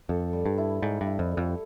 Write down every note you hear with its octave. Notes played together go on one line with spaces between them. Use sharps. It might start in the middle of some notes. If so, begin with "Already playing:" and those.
F2 A4
G3
G2
E4
G#2 G3
G2
E4
F2
A4
F2